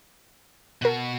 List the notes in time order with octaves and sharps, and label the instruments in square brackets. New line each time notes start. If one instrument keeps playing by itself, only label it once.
[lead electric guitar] B2 F#4 [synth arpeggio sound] A#4 F#6